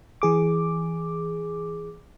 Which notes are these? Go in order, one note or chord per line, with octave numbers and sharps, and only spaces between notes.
E3 G#4 D6